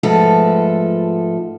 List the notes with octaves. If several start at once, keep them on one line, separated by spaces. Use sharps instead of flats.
G#2 F3 A3 A4 B4